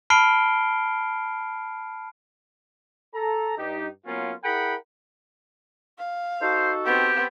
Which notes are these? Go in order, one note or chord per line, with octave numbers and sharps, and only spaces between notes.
A5 B5 F6 C7 D7 G7
A4 A#5
G2 D#4 G4
F#3 A#3 B3 C#4 F4
E4 G#4 A#4 F#5 G5 B5
F5
D#4 F#4 A4 C5
B3 C4 G4